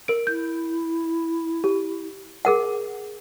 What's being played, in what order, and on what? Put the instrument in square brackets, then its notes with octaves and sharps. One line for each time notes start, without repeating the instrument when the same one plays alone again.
[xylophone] A#4 D7
[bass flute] E4 [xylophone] G6
[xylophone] G4
[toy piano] G#4 A#4 F#5